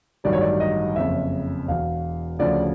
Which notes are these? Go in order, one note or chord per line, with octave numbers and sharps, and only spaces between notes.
A1 G2 D#3 F#3 D5
C#5
D5
D#5
F#1 F2 C#3 E5
E1 E2 B2 F5
D2 C#3 F3 D5